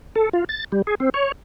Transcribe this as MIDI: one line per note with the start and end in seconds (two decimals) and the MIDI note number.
0.16 0.29 69
0.33 0.44 65
0.49 0.64 93
0.72 0.82 55
0.87 0.95 68
1.00 1.10 60
1.14 1.32 73